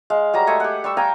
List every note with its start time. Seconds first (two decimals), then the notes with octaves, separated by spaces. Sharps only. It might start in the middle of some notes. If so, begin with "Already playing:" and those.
0.10 G#3 F5
0.34 F#3 G3 A#5
0.47 G#3 A3 G#5
0.60 G4 F#5
0.84 G3 C#6 E6
0.97 F5 G5 G#5 A#5